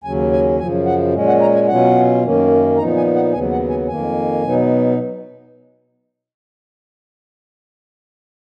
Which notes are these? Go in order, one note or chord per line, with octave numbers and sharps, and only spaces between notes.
D#2 C#3 F#3 C#4 G#5
G#5
F#2 C#3 F3 G#5
F#5
A#2 G#3 C#4
F#5
A#5
G#5
B2 F#3 C#4 F4 F#5
F#2 D#3 A#3 C#4
A#2 F3 B3 D#4 A#5
G#5
F#5
D#2 C#3 F#3 B3 G#5
F#5
G#5
F2 D#3 A#3 G#5
B2 F#3 B3 D#4